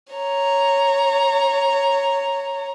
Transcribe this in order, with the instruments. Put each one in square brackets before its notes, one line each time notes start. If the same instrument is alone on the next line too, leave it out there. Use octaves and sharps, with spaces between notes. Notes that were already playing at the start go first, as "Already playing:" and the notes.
[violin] C#5 A#5